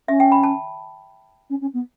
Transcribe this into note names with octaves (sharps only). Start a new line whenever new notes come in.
C#4 E5
G5
B5
A5
C#4
C#4
B3